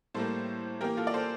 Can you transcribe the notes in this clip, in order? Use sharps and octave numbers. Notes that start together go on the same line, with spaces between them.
A2 G3 A#3 A4 C5
E3 A#3 G4 A#4
F4 A4
D5
A4 C5